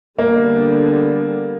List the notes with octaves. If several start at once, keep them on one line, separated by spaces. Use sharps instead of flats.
D3 G3 A#3 B3 D4